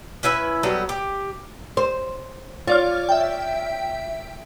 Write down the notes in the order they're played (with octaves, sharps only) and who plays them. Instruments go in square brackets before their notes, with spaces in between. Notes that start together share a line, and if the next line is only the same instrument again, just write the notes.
[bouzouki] C#4 E4 B4 E5
F#3 G3 B3 A4
G4
[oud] C5
[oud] F4 [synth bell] C#5 D5 F6
[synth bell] E5 G5